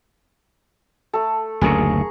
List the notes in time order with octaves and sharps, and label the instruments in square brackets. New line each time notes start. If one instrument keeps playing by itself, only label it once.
[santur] A3 A4
[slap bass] F#1 D2 C#3 [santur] G#4 A#4 C#6